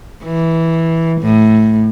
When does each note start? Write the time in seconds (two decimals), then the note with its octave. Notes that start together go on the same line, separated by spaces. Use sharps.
0.23 E3
1.21 A2